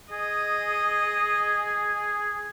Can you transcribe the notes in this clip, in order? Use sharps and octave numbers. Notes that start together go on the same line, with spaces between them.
G#4 D#5